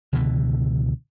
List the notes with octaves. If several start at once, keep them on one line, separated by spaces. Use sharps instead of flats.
C#2 B2 D3 E3